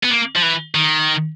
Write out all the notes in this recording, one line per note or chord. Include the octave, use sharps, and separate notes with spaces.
B3
A#3
F3
E3
D#3